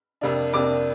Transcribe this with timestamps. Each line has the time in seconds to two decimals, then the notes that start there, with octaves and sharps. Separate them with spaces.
0.21 F2 C3 A#3 D4
0.53 F2 C3 A#3 D4 D6